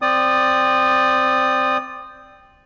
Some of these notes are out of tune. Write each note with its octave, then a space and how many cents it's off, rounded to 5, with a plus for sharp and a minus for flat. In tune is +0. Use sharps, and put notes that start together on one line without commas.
C4 +0 D5 +0 D#6 -20